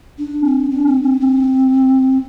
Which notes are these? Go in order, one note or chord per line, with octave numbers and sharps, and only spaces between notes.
D4
C4
D4
C4
C4
C4